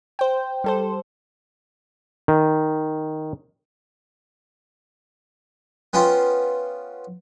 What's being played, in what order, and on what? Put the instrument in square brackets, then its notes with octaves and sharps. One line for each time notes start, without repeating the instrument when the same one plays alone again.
[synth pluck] C5 G5
G3 A4 C5
[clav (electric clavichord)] D#3
[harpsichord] B3 C#4 F4 G5 C6